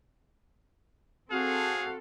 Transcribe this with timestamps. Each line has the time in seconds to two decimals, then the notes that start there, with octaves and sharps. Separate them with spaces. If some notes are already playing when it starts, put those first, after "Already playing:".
1.32 C4 F#4 G#4 A4 F5